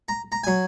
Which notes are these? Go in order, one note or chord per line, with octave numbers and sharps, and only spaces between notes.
A#5
A#5
F#3 G#5